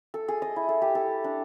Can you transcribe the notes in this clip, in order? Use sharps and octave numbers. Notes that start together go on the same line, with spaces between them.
A4
G#4
D#5
E4
A4
G4
A4
D4